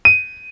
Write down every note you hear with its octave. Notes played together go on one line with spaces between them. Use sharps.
D#7